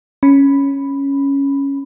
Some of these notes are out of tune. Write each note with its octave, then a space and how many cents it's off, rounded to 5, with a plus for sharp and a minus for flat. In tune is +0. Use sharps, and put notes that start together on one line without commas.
C#4 +0 B5 +0